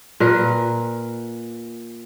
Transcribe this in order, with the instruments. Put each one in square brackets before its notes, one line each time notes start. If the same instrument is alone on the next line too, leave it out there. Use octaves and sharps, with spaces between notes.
[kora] A#2 A#4 B4